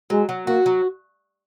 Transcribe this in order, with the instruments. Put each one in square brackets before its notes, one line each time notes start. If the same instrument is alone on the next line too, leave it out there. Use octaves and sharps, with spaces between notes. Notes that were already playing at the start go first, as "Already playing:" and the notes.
[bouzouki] F#3 [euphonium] G#3
[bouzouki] F#3
[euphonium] A#3 [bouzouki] F#4
[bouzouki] F#3